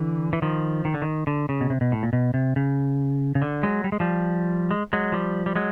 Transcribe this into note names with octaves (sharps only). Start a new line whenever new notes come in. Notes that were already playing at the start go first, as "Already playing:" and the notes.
Already playing: D3 E3
E3
D#3 F3
D#3
D3
D#3
D3
C#3
B2
C3
B2
A2
A#2
B2
C3
C#3
C#3
D3
F#3 G#3
G3
G#3
F3 G3
G#3
F#3 G#3
F3 G3
G3
F#3 G#3